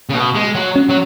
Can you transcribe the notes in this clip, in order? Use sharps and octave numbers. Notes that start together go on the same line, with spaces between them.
C#3
B2
G#3
F#3
C#4
F#3